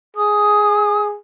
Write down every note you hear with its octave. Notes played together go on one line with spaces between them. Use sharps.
G#4 D#6